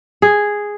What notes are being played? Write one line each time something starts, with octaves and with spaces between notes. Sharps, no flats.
G#4